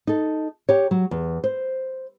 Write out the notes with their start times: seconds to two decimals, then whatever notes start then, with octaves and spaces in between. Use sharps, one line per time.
0.07 D#4 A4
0.69 G4 C#5
0.91 F#3
1.11 E2
1.44 C5